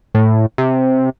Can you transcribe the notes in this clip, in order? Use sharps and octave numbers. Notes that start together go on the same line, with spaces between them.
A2
C3